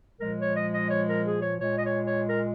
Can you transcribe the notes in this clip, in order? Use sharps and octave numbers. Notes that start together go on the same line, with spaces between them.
A#2 F3 G#3 A#4
C#5
D#5
D#5
C#5
A#4
G#4
C#5
A#2 G#3 C#5
D#5
C#5
C#5
A#4